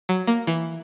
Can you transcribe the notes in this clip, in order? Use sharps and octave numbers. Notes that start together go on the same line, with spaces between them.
F#3
A#3
E3